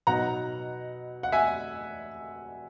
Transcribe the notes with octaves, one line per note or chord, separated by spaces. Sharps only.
B2 F#3 B3 D#4 F#5 A#5
F#5
E5 G#5